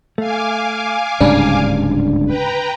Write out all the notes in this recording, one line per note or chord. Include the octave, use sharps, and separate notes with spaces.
A3 F5 G#5 D6
D1 G#2 C#3 G3 D4
B4 G5 A#5